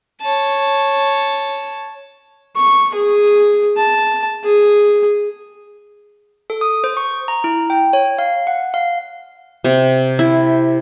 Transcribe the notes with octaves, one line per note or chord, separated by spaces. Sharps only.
C#5 A5
C#6
G#4
A5
G#4
A4
D#6
C5
C#6
A#5
E4
G5
C#5
F5
F#5
F5
C3
E4